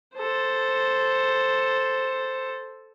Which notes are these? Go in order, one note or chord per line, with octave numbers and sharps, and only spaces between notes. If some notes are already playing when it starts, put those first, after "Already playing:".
A4 C5